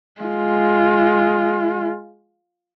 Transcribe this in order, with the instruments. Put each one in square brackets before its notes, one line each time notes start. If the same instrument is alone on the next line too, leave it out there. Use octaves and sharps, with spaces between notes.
[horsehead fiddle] G#3 F4